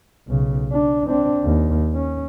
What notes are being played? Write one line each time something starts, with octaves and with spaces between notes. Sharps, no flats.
B1 C#3
D4
C4 D4
D#2
C#4